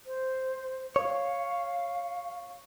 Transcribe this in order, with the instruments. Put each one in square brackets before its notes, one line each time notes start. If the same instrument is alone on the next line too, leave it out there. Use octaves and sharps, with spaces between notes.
[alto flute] C5
[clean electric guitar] C#5 [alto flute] F5